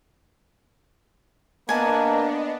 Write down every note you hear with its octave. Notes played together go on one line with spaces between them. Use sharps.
A#3 B3 D4 D#5 G#5 A5